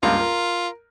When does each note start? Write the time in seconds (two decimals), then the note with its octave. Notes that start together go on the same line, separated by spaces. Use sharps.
0.03 C#2 G2 A#3 F4
0.19 A#4